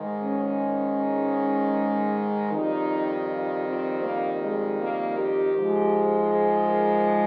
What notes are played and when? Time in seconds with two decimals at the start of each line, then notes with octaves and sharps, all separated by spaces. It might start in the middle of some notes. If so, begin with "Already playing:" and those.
Already playing: G#2 D#3 G#3
0.24 C#4
2.52 F2 D#3 G3 D#4
3.29 F4
3.66 C4
4.03 A#3
4.42 G#3
4.80 A#3
5.18 G4
5.55 G#2 F3 G#3
6.33 G#4
6.69 A#4